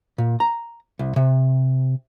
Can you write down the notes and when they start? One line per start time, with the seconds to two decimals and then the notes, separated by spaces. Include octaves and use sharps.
0.18 A#2
0.40 A#5
0.99 C2
1.16 C3